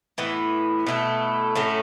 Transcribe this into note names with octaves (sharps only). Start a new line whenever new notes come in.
A2 E3 B3
B2 A3 E4
A2 F#3 A3 C#4